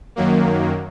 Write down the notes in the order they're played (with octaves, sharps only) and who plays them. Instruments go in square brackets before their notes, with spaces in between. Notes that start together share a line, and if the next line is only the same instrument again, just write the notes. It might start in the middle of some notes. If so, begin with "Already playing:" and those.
[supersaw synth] F#2 D#3 F#3 A#3